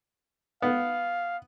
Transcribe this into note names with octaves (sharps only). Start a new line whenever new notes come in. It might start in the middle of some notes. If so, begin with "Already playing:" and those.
B3 F5